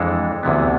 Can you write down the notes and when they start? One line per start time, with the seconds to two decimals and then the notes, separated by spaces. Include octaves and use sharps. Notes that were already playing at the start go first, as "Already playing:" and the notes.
Already playing: F2 E3 G#3 D4 A4
0.43 D2 C3 E3 B3